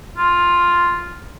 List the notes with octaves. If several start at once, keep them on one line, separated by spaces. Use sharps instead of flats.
F4